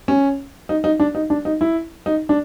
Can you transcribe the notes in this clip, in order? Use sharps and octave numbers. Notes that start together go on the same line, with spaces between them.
C#4
D#4
D#4
D4
D#4
D4
D#4
E4
D#4
D4